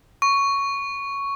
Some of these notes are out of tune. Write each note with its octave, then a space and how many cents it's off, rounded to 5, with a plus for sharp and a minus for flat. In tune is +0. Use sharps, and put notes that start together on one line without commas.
C#6 +5